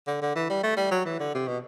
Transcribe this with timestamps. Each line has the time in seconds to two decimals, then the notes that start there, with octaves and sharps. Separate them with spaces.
0.07 D3
0.22 D3
0.35 E3
0.50 G3
0.63 A3
0.77 G3
0.91 F#3
1.05 E3
1.20 D3
1.34 C3
1.48 B2